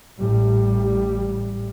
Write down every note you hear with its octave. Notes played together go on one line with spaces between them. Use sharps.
A1 A2 G3